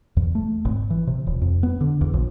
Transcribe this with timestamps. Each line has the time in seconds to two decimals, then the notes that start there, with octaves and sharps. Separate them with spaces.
0.17 E2
0.35 A3
0.65 G#1
0.90 E3
1.07 C3
1.27 D#1
1.41 F2
1.63 B3
1.81 D3
2.01 E2
2.14 A#1